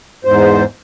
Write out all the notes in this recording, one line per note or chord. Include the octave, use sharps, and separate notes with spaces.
E2 G#2 C5